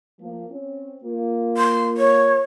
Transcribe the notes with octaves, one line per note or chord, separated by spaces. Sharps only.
F3 A#3
C4 C#4
A#3 F4
C6
C#5